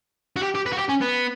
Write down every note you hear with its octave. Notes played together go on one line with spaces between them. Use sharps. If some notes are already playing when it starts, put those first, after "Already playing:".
F#4
G4
G4
B4
F#4
G4
C#4
B3